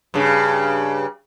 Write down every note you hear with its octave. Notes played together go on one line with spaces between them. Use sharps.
G2 C#3